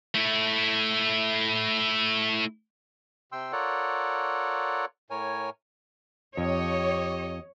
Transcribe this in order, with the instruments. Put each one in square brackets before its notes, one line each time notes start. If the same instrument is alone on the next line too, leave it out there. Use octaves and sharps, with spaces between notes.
[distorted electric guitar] A3 E4
[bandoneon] C3 G5 C6 E6
F4 A4 A#4 C#5 D5 F#5
A2 A#4 C#5 G#5
[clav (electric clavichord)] F2 [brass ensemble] G4 D#5 [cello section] C#5